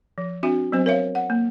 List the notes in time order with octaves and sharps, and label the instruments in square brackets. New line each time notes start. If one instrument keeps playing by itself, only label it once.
[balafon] F3
C4 D4 F#4 E5
F#3 B3 C4 C5
A#4 C#5 E5 F5
F#5
A#3